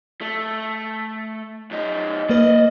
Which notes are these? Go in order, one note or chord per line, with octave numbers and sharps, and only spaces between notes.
A3
F#2 D#4
A#3 B4 D5 D#5